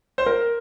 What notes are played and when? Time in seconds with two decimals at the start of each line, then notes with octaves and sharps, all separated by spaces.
0.18 C5
0.26 A#4